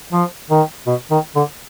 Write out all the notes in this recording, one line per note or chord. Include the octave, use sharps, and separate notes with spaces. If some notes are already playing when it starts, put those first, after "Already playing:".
F3
D#3
B2
D#3
D3